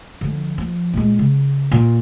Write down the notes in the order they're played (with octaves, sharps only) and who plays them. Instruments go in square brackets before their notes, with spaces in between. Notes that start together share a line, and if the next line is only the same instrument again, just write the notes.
[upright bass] D3 F3
F3
A#2 G#3
C#3
A#2